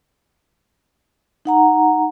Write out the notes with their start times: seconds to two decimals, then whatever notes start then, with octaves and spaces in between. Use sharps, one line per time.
1.45 D#4 F#5 A#5